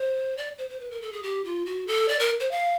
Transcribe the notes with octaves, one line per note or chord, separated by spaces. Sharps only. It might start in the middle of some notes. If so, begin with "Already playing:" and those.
Already playing: C5
D5
C5
C5
B4
A#4
A4
G#4
G4
F4
F#4
A4
D5
A#4
C5
F5